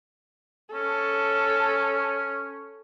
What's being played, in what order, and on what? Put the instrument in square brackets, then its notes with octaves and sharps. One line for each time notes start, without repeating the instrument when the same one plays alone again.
[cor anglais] C#4 [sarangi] A4